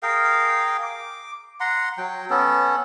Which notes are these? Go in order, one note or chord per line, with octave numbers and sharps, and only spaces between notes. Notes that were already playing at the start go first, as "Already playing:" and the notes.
G#4 A#4 F5 G5
D6
F#5 A#5 C6
F#3 G5
B3 C#4 A4